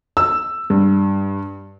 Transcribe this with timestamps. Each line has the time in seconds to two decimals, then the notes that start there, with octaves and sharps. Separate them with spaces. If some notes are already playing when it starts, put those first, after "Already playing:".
0.17 E6
0.70 G2